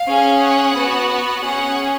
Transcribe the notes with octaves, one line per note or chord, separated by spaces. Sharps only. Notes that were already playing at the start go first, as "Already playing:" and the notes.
Already playing: F5
C#4 G#4
F#5
B3 F#4
F#5
C#4 G#4 F#5